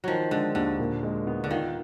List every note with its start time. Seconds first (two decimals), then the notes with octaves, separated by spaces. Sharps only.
0.04 D#3 F3 F#3
0.31 D3 G#3
0.55 D#2 D3
0.79 A#2
1.03 G#3
1.27 B3
1.44 D3
1.50 D#3 F4